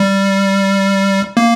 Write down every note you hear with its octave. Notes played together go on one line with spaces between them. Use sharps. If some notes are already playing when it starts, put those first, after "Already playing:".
Already playing: G3
A#3